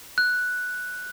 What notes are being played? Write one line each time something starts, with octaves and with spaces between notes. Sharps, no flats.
F#6